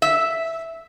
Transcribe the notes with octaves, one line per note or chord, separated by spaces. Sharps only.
E5